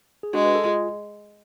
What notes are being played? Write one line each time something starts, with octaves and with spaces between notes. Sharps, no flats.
G#4
G#3 D4 F#4
B4
A4
F4 G#4